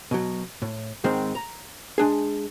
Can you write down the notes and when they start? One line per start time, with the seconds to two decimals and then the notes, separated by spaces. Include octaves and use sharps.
0.11 B2 F#3
0.62 A2
1.04 G#2 D#3 G#3 C4
1.35 A#5
1.98 G#3 D4 G#4